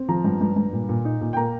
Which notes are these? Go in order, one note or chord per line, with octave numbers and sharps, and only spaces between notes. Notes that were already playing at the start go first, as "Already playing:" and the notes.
Already playing: C4
F3 A#5
G2
G2
G2
A#2
A#2
D#4
A#2
G5
A#3 A#5